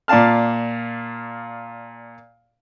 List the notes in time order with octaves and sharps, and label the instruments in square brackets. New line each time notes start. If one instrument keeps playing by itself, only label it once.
[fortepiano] A#2 D5 F5 A5 F6